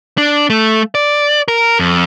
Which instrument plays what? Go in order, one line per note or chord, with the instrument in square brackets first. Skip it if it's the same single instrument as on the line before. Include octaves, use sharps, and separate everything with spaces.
[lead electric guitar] D4
A3
D5
A#4
F2